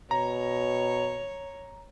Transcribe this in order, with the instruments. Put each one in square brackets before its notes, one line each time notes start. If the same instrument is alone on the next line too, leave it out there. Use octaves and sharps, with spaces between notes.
[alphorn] B2 [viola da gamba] C#5 [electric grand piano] A#5